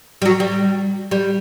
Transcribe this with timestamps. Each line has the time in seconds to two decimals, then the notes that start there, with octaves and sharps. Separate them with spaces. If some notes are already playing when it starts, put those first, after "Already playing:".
0.22 G3
0.26 F#3
0.40 G3
1.11 G3